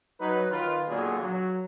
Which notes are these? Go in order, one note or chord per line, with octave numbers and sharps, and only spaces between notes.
F#3 D#4 B4
D#3 F4 B4
A#2 D3 D#3 F#3 B3 G#4
F#3